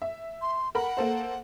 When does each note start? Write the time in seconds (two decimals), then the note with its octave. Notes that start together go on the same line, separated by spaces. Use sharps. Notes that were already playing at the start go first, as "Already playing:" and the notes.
0.02 E5
0.42 C6
0.75 A#4 F#5 B5
0.97 A#3 A4 C5